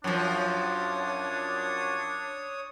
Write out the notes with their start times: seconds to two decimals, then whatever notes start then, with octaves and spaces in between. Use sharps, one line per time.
0.04 F#2 F3 D4 C#5 D#6